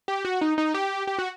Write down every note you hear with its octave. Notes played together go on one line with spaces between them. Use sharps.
G4
F#4
D#4
D#4
G4
G4
F#4